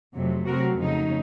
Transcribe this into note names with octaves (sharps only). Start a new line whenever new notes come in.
F2 C3 F#3 A3
C3 F#3 A3 C4 F#4 A#4
F2 C#3 F#3 A3 D#4